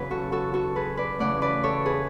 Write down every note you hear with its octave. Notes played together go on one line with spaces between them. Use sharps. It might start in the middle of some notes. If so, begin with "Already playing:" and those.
Already playing: E2 C#3 F#3 B4
F#4 A4
F#4 A4
F#4 A4
G#4 B4
B4 D5
C#3 E3 A3 D5 F#5
B4 D5
A4 C#5
G#4 B4